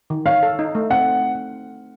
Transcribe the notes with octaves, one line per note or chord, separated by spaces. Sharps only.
D#3
C#5 F5
A4
D#4
A3
C4 F#5